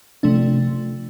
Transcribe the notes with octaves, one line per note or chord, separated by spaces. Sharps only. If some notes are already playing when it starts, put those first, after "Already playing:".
C3 F3 A3 D4